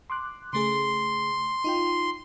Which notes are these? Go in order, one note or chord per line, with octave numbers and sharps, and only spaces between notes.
C6 D6 F#6
C#3 A3 G#4 C6
D#4 F4 G5